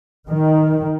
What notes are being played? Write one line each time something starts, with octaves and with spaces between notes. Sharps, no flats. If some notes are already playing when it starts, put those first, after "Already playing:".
D#3